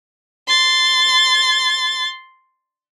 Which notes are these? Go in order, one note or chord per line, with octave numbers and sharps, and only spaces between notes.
C6 A6